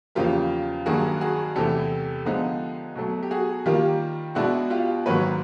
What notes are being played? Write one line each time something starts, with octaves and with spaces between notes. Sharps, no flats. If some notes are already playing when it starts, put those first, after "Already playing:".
E2 C#3 F3 A#3 F4 G4
G2 D#3 F#3 A#3 F#4 G#4
F#4 G#4
E2 C3 E3 A3 G4 A4
D3 F3 G#3 B3 D#4
B2 F#3 A3
G4
F#4 G#4
D#3 G3 A#3 F4 G4
B2 G#3 B3 D4 E4 F#4
F4 G4
G#2 D#3 F#3 A#3 B4 C#5